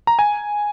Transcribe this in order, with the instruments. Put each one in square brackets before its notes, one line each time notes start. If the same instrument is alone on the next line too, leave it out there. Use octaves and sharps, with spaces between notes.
[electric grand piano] A#5
G#5